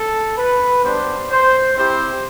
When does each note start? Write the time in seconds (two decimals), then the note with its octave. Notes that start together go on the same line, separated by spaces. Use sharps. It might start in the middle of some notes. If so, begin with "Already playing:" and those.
Already playing: A4
0.37 B4
0.83 G3 B3 D4 C5
1.30 C5
1.77 C4 E4 G4 C5